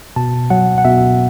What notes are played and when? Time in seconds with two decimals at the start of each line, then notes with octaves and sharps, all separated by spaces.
0.16 B2 A5
0.50 F#3 F#5
0.78 F#5
0.85 B2 E5